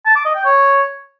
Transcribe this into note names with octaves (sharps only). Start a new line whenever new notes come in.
A5
D6
D#5
G5
C#5